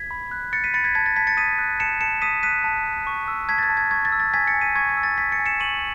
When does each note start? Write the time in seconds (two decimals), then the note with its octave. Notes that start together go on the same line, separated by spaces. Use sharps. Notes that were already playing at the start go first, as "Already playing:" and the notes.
Already playing: G#6 B6
0.11 B5
0.31 F#6
0.53 F#6 A6 C#7
0.64 B6 D#7
0.74 B5 A6 C#7
0.84 G#6 B6
0.95 A5 G#6 B6
1.06 A6
1.16 A5 G#6 B6
1.27 A6 C#7
1.37 D#6 B6 D#7
1.59 F#6
1.80 A5 C#7 E7
2.01 A5 C#7 E7
2.22 D#6 B6 D#7
2.43 F#6 B6 D#7
2.64 A5
2.86 A5
3.07 C#6
3.28 E6
3.49 A5 G#6 B6
3.58 A6
3.63 G#6
3.69 A5
3.77 G#6
3.91 C#6 G#6
4.05 A6
4.12 E6
4.20 A6
4.34 G#5 G#6 B6
4.47 A6 C#7
4.54 G#5
4.61 B6 D#7
4.75 C#6 G#6
4.89 G#6
4.97 E6
5.03 A6
5.18 G#5 G#6 B6
5.32 A6 C#7
5.39 G#5
5.46 C#7 E7
5.60 C#6 D#7 F#7